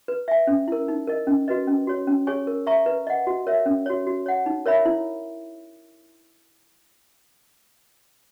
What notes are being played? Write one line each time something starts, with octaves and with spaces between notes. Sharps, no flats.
B4
E5 G#5
C#4
E4 A#4
D#4
A#4 D#5
C#4
F#4 B4 D#5
C#4
F#4 C#5
C#4
G#4 C#5 G#5 C#6
A#4
E5 A#5 C#6
B4
D#5 F#5
F#4
A#4 C#5 E5
C#4
F#4 C#5
F#4
C#5 F#5
D#4
A#4 C#5 E5 B5
E4